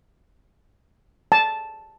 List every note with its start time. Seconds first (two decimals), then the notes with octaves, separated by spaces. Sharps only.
1.32 A5